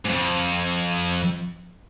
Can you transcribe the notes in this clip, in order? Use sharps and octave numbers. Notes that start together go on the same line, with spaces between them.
F2 G#2